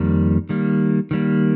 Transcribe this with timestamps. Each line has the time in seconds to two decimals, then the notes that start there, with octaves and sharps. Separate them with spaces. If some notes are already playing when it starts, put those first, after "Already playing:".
Already playing: F2 D#3 G3 A#3
0.49 D#3 G3 A#3
1.11 D#3 G3 A#3